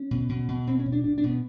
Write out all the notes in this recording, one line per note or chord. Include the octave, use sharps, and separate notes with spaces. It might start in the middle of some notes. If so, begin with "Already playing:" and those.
Already playing: C#4
B2
B2
B2
B2 C4
C#4
B2
D4
B2 D4
D4
B2
B3